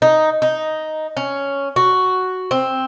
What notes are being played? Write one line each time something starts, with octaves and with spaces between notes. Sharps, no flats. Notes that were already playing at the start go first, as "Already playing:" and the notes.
D#4
D#4
C#4
F#4
C4